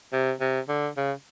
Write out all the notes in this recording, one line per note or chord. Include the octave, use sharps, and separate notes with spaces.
C3
C3
D3
C#3